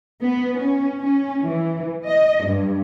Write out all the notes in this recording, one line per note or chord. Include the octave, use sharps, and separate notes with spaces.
B3
C#4
C#4
E3
D#5
G2